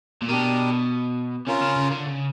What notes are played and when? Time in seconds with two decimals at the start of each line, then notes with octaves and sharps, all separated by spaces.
0.22 A#2
0.29 B2 D4 G4 A#4
1.47 C3 C#4 F4 A#4
1.61 C#3
1.76 C#3
1.91 D3
2.06 C#3